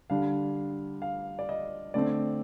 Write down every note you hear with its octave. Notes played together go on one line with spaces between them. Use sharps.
D3 G3 D4 F5
F5
D5
D#5
D3 A3 C4 D5